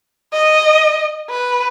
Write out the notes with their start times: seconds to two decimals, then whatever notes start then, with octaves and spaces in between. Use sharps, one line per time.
0.33 D#5
1.30 B4